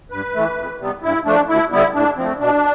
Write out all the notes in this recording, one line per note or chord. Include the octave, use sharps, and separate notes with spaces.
G2 B4
E3 A3
F2
C3 G3 B3
G2 E4
F3 A3 D4
D2 E4
D3 G3 B3 E4
A2 D4
F3 A3 C4
B2 D4